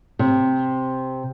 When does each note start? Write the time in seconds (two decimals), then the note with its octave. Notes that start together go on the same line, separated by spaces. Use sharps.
0.19 C3